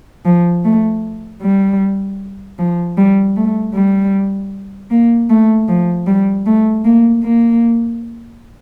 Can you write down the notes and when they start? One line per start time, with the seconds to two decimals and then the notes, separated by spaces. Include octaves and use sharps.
0.25 F3
0.65 A3
1.42 G3
2.59 F3
2.97 G3
3.37 A3
3.74 G3
4.91 A#3
5.30 A3
5.68 F3
6.07 G3
6.46 A3
6.85 A#3
7.24 A#3